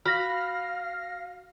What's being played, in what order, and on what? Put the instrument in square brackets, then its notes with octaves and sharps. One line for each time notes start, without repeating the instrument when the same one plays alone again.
[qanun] F#4 B5 [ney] F5 [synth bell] F6 A#6